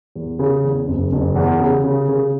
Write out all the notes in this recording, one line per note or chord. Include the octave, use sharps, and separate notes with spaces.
E2
C#3
E2
F#1
F#1
E2
C#3
C#3
C#3